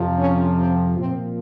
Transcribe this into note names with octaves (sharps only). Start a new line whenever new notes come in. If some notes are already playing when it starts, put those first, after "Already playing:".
Already playing: F2 C3 F3
C#4
C4
A#2 F3 C4